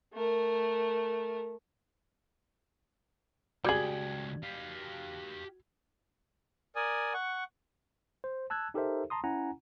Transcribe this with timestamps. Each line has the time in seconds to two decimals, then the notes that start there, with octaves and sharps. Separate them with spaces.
0.14 A3 A#4
3.64 C#2 G3 F#4 G#4 G5 G#6 F#7
4.43 G4 F5
6.76 A#4 D5 G#5 D#6
7.14 F#5 C#6
8.24 C5
8.50 A5 E6 F#6 G#6
8.74 D#4 G4 A4 A#4 C5 E5
9.10 A5 A#5 C6 D#6
9.24 C#4 E4 F#5 G#5 A#5